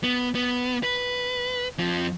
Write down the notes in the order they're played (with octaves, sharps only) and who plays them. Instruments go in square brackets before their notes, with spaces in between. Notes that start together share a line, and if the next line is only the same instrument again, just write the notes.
[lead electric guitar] B3
B3
B4
F2 F3